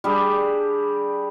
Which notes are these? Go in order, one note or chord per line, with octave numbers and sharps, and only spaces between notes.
G3 D4 G4 G#4